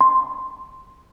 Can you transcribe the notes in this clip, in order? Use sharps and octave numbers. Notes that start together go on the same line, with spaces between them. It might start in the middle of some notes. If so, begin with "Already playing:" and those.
C6